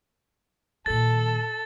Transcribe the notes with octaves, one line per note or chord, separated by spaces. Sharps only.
A#2 D#3 A4 A6